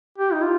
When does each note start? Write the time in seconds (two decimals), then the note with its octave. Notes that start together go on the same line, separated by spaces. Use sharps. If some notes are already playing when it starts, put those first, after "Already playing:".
0.18 G4
0.33 D#4
0.42 F4